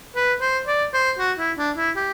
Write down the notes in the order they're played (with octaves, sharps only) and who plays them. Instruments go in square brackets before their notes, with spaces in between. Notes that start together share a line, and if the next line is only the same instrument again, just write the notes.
[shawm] B4
C5
D5
C5
F#4
E4
D4
E4
G4